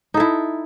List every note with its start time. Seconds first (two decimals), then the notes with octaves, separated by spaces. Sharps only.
0.14 D#4
0.17 A4
0.20 E4